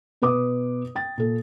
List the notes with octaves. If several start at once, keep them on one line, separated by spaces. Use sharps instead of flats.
B2 B4 D6 D#6
G5 A6
A#2 A4